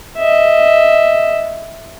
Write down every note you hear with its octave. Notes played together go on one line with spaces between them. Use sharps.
D#5 E5